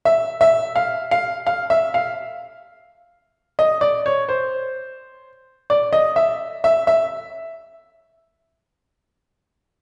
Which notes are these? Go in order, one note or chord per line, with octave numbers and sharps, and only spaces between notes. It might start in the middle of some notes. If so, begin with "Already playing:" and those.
E5
E5
F5
F5
F5
E5
F5
D#5
D5
C#5
C5
D5
D#5
E5
E5
E5